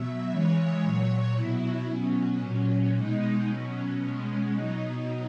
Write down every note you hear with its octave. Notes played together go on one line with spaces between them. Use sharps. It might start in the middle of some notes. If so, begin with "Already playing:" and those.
Already playing: B2 F#3 E5
C#3 E3 G#3 C#5
A#2 F#3
B2 F#3 E4
B2 F#3 C#4
A#2 F#3
B2 G#3 D#4
B2 F#3 C#4
B2 G#3
B2 F#3 D#4